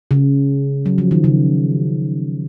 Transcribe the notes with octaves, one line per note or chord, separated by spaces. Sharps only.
C#3
F#3
F3
D#3
C#3